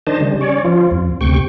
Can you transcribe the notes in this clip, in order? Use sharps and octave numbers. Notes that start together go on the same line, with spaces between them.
D#3 D4 C5 D#5 A5
C#3 G3
C#4 C#5 D5
F3 F4
F2
D2 C3 G5 C#6